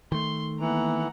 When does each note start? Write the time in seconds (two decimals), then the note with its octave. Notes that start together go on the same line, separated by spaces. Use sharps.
0.12 D#3 A3 C6
0.60 E3 A#3 B3 F#5 A#5